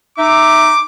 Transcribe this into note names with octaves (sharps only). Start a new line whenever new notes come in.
D#4 E5 D6